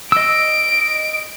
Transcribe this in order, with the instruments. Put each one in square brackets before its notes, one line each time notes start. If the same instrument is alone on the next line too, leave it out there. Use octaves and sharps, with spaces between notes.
[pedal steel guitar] D#5 E6 [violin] D7